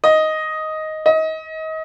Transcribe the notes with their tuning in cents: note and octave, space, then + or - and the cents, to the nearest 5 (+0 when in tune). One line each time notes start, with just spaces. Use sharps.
D#5 +5
D#5 +30